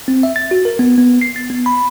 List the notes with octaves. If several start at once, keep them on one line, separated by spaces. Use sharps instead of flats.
C4
E5
A6
F#4
A#4
B3
B3
C7
A6
B3
B5